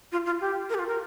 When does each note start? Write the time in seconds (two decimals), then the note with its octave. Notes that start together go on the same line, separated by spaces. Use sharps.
0.12 F4
0.26 F4
0.41 G4
0.70 A#4
0.74 G4
0.79 F4
0.88 A#4